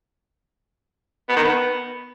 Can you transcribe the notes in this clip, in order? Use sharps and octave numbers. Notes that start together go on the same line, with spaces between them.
B3
D#3
B3